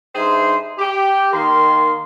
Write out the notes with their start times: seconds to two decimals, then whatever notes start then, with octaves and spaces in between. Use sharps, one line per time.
0.15 G2 D#4 G#4 C5 E5 C6
0.78 G4
1.33 D#3 A#3 C6